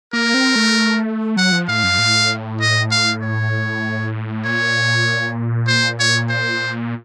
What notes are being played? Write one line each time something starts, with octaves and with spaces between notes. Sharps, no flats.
A#3 A#4
C4
A3
F#3 F#5
F3
A2 F5
F#2
A2
D#5
F5
C#5
A#2 C#5
C5
C#5
C5